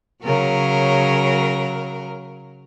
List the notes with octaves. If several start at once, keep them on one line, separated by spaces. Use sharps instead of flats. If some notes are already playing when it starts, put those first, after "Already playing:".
C#3 F#3 A#4